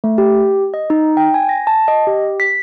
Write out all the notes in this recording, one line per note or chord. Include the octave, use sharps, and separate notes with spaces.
A3
G4
D#5
D#4
G5
G#5
A#6
A5
D#5
G4
B6